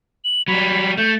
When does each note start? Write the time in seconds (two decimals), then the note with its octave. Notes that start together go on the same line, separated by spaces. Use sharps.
0.24 F#7
0.48 F#3 G3 B5
0.97 A3 G6